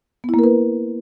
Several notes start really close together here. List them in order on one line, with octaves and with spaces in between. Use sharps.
B3 E4 A#3 A#4 B4